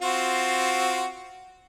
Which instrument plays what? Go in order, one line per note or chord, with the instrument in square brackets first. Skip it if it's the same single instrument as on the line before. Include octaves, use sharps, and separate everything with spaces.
[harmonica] C4 F4 F#4